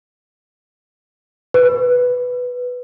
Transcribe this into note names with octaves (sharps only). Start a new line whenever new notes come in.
B4